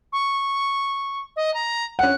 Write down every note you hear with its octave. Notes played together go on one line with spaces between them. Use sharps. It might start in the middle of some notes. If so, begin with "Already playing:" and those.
C#6
D#5
A#5
C#4 F#5 F#6